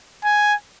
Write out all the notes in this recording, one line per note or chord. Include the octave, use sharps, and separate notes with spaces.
G#5